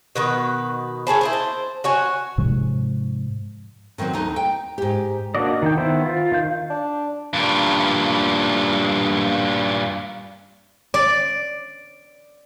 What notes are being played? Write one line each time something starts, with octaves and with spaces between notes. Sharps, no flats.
B2 D#3 B4 F#5
G#4 C5 C#5 A5 B5
E4 A#4 C5 D#5
A5
F#4 C#5 G#5
G#2 C3 F3 G#3
D3 D#3 F#3 C4
D2 D#4
G5
G#2 G4
A#3 D4 F#4 D5 D#5
D#3 G5
D#3 B3 E4 C5 G5
F4
D#3 F5 G6
D4
G2 A#2
D5